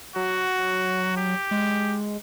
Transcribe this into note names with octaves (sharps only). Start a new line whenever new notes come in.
F#3 F#4
G4
G#3